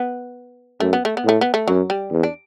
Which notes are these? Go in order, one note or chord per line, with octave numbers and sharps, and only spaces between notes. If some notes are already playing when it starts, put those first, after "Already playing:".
Already playing: B3
F#2 A3
B3
A3
B3
A2 A3
B3
A3
F#2 F#3
G3
E2
D4